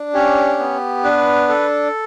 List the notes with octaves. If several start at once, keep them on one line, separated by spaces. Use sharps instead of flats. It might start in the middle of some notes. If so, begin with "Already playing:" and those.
Already playing: D4
C#4 G4 C#5
B3
D4 B4
A4